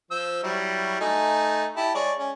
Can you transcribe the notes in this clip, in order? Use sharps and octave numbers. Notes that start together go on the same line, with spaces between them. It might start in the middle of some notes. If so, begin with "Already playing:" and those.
F3 C5 E6
F#3 G3 E4
A3 D#4 G#5
E4 G4 A5
G#3 C#5 D5
C#4